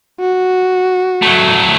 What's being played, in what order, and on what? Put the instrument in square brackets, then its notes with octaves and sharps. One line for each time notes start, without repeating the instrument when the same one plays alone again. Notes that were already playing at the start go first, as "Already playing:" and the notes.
[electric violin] F#4
[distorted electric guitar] F#3 A3